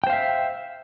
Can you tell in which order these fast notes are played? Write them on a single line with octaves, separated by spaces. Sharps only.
G5 C5 F5 E5